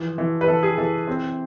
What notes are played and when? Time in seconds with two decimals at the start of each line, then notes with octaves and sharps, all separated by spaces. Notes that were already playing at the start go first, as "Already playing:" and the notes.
Already playing: E3 F3 G#4
0.18 E3
0.41 B4
0.47 E3 A4
0.63 G#4
0.78 E3 A4
1.08 C4